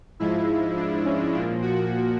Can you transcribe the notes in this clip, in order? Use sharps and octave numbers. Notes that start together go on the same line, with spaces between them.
G#2 F3 G#3 E4
D4
C#4
A#2 F3 A#3 D4
F#4